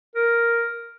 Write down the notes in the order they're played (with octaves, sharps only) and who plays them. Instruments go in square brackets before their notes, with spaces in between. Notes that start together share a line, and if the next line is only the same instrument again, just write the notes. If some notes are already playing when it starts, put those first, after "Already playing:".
[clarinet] A#4